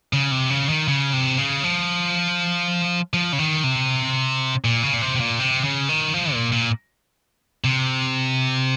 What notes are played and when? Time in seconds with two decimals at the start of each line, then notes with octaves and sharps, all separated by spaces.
0.13 C#3
0.31 C3
0.50 C#3
0.69 D#3
0.88 C#3
1.13 C3
1.38 C#3
1.63 F3
3.14 F3
3.33 C#3
3.39 D#3
3.64 C3
4.64 A#2
4.83 C#3
4.94 A#2
5.02 C3
5.16 C3
5.20 A#2
5.40 C3
5.64 C#3
5.89 D#3
6.14 F3
6.33 A#2
6.52 A#2
7.64 C3